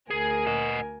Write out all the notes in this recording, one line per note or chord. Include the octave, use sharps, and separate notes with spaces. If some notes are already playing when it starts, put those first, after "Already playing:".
D2 G#4 A#4 G#5
D#5 F#5